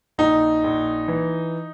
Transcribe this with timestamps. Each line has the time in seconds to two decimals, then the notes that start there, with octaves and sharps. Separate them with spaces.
0.18 A#1 D#4
0.64 A#1
1.08 E3